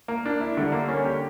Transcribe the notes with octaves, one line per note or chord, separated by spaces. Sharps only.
A#3
D4
E4
D3 G3 D4
A#3
C#4
G4